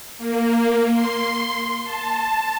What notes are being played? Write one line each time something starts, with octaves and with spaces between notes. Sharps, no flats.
A#3
C6
A5